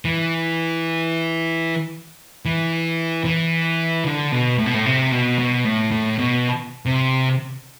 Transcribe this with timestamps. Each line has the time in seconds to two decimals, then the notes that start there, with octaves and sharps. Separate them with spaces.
0.05 E3
2.45 E3
3.25 E3
4.05 D3
4.32 B2
4.58 A2
4.66 B2
4.74 A2
4.86 C3
5.12 B2
5.39 B2
5.65 A2
5.91 A2
6.19 B2
6.86 C3